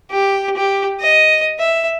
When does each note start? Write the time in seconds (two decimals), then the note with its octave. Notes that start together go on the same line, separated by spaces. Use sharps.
0.11 G4
0.57 G4
1.00 D#5
1.59 E5